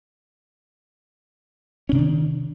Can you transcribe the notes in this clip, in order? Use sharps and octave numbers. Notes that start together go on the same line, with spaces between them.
C3 D#3 C#4 D4